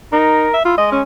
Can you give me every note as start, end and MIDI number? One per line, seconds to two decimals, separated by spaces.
0.12 0.48 63
0.12 0.54 70
0.54 0.63 76
0.65 0.74 64
0.65 0.74 65
0.78 0.99 56
0.78 0.90 75
0.92 1.02 61